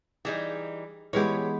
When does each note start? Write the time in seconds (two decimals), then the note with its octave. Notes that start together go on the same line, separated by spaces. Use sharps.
0.25 E3 G3 D#4 G#4
1.13 E3 G#3 B3 G4 C#5